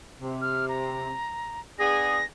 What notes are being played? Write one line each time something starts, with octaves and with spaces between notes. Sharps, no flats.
C3
F6
A#5
B3 D4 G#4 A#6